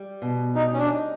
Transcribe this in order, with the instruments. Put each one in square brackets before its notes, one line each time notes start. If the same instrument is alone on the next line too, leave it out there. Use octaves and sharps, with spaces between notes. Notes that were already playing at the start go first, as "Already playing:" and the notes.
Already playing: [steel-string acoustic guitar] G3
B2
[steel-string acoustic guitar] G3 [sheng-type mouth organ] D#4
[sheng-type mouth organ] C#4
D4
[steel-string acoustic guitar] D#4